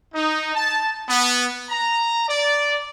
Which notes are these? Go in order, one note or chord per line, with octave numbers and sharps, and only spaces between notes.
D#4
A5
B3
A#5
D5